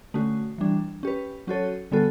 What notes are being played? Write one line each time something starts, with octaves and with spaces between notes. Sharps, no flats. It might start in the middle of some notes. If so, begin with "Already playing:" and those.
D3 A3 C#4 F#4
E3 G3 D4
C#4 G4 B4
F#3 C#4 F#4 A4 C#5
D3 G3 B3 F#4 A4